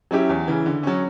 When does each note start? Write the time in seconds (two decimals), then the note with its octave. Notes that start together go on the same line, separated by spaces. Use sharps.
0.11 F#3 C#4 E4 G4
0.29 E2
0.48 C#3 E3
0.66 D3
0.83 F#3 C#4